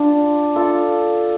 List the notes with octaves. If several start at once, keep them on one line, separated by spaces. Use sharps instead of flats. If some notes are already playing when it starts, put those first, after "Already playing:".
Already playing: D4 F4
F4 A4